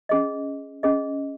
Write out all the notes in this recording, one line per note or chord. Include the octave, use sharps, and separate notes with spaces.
C#4 G#4 D#5
C#4 G#4 D#5